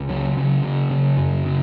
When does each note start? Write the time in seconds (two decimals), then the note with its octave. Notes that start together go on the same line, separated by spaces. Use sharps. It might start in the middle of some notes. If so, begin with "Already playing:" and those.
Already playing: C#2
0.09 C#3 F#3
0.37 C#3 F#3
0.63 C#3
0.91 C#3
1.17 F#2
1.45 C#3